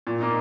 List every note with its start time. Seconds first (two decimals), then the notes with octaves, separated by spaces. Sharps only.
0.07 A#2
0.21 A#3 D#4